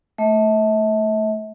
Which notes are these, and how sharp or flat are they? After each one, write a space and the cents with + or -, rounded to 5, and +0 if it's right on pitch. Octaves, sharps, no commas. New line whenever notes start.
A3 +0 E5 -40